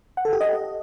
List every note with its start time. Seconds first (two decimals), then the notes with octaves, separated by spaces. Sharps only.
0.17 F#5
0.25 A4
0.33 G4
0.40 D#5